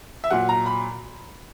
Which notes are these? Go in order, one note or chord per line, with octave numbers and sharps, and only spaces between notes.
E5
A#2 F#3 F#5
A#5
B5